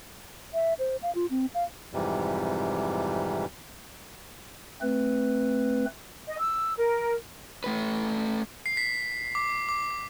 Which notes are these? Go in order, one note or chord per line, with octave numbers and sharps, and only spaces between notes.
E5
C5
F5
F4
C4
F5
F2 G#2 C3 E3 G3
A3 C4 B4
D#5
E6
A#4
A3 B4
C7
B6
D6
D6